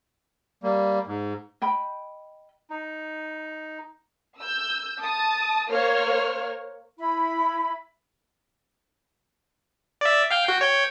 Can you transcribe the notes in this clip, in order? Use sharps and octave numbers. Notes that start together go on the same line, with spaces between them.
G3 A#3
G#2
D#5 G5 B5
D#4
E6 G6
A5 D#6
A#3 C5 C#5 F6
E4 B5
D5 E5
F5 G5
F#4 G5
C#5 G5